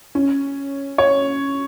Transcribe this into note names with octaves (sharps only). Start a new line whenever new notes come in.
C#4
C#5